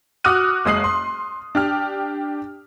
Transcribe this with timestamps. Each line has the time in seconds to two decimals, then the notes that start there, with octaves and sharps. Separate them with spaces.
0.24 F#4 D6 D#6 F6 F#6 D#7
0.65 F#1 G#3 D#6 C7 F#7
0.84 C6
1.55 D4 G4 F6